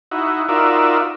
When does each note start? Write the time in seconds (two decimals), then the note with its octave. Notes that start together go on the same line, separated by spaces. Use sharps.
0.11 D#4 E4 F#4
0.49 D#4 F4 F#4 A#4 D5 E5